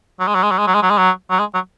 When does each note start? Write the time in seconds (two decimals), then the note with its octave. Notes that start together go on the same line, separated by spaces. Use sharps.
0.20 F#3
0.28 G#3
0.35 F#3
0.43 G#3
0.51 F#3
0.58 G#3
0.67 F#3
0.75 G#3
0.83 F#3
0.90 G#3
0.98 F#3
1.30 F#3
1.39 G#3
1.54 F#3